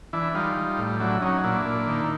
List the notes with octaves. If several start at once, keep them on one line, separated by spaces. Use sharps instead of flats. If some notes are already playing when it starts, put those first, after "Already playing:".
E3 D4 E4
G3 D#4 F4
G3
A2
F#3 D4 E4
F#3 C#4 D#4
A#2 D4 E4
A#2
D#3